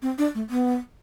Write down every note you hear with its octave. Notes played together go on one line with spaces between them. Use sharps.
C4
D4
A3
B3